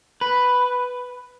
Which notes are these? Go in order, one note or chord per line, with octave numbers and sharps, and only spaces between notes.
B4